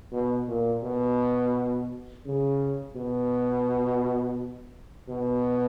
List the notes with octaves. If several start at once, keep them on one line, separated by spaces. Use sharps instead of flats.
B2
A#2
B2
C#3
B2
B2